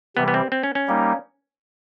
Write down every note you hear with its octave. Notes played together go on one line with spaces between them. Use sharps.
C3 E3 G3 B3
B3
C4
C4
C#4
C#4
G3 A#3 D#4